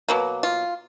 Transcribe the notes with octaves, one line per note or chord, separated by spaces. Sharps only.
B2 F#3 A#3
F4